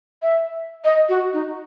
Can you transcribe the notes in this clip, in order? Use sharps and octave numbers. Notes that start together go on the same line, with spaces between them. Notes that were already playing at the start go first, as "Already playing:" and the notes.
E5
D#5
F#4
D#4